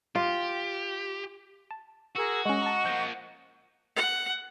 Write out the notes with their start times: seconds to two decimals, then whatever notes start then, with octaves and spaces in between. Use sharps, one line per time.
0.15 F4 G4
1.71 A5
2.16 F#4 G#4 A#4 E6
2.45 G#3 C#4 D#5 F#5 C#6
2.62 A5 A#5
2.85 F3 A#3 G6 A#6
3.96 F#5